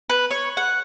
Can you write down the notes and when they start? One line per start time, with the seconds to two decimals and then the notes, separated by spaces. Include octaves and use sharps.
0.10 B4
0.31 C#5
0.57 F#5